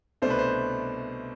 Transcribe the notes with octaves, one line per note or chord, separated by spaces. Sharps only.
C2 B2 A3 D4 C5
B4
C5